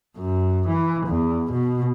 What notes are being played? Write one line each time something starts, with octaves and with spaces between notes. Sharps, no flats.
F#2
E3
E2
B2